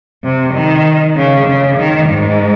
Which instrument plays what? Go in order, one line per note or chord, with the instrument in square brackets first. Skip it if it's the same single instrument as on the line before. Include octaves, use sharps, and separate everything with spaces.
[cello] C3
D#3
C#3
C#3
D#3
G#2